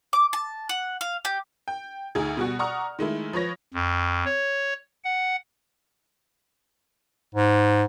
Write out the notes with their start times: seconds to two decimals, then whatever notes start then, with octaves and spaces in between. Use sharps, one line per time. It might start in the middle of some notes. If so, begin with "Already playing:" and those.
0.13 D6
0.33 A5
0.69 F#5
1.01 F5
1.25 G4
1.68 G5
2.15 D2 D#4 G#4
2.37 B2 G3 F#4
2.59 D5 F#5 A#5 C#6 D#6 F6
2.99 D#3 G#3 A3 E4
3.33 F3 B4 C#5 A#6
3.74 F2
4.25 C#5
5.04 F#5
7.35 G#2